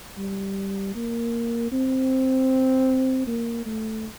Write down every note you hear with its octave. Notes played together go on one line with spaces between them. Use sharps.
G3
A#3
C4
A#3
A3